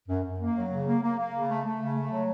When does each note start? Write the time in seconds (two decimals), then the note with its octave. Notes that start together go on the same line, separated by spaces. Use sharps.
0.08 F#2
0.24 F#2
0.39 A#3
0.55 F#3
0.71 C#3
0.87 A#3
1.02 A#3
1.18 A#3
1.33 C#3
1.49 A3
1.64 A3
1.80 C#3
1.96 A3
2.11 F#3